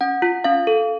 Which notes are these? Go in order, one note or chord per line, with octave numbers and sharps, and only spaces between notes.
C#4 F#5
F4
C#4 F5
A4